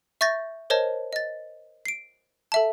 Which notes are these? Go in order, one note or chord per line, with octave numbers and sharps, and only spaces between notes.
E5 C#6 G6 A6 A#6
A#4 C5 C#5 D#5 A5
D#5 A6
C7 D7
A4 E5 A5